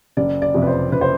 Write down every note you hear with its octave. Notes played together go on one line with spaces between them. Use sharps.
F#1 D5
D5
F2 C3
B4
C5
F#1 B4
C5